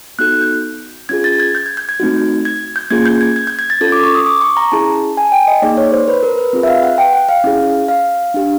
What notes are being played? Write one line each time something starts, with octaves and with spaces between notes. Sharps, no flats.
B3 D#4 F#4 A4 F#6
G6
C#4 F4 G#4 G#6
A6
G#6
G6
G#6
G6
G#6
A3 C4 D#4 F#4
G#6
G6
A#3 C#4 F4 G#4 G#6
G6
G#6
G#6
G6
G#6
A6
C#4 F4 A4 G#6
D6
C#6
D#6
D6
C#6
A#5
C#4 E4 G#4 A5
G#5
G5
D#5
A#3 D#4 G#4 D5
C#5
C5
B4
A#4
B4
C4 F4 G#4 B4
E5
F5
F#5
G5
F#5
F5
C#4 E4 G#4
F5
D4 G4